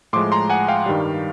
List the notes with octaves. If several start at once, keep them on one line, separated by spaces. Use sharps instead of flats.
A2 F3 G#3 C6 D6
A#5 C6
F#5 G#5
F5 G5
G2 D#3 G3